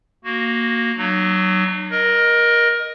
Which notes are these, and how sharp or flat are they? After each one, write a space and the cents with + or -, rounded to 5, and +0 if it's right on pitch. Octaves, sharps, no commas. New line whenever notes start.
A#3 +0 F#4 +0
F#3 +15 D#4 -45
A#4 +20 D#5 +0